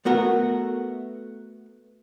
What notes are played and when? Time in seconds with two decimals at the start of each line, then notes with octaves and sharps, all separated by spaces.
0.05 A3 B3 F#4 A#4